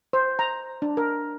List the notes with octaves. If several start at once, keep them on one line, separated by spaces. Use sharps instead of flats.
C5
A#5
D4
A#4